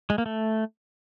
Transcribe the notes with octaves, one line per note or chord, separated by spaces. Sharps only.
G#3
A#3
A3